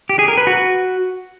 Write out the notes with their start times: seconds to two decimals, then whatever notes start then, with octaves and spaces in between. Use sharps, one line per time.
0.09 G4
0.19 G#4
0.28 A#4
0.38 B4
0.47 F#4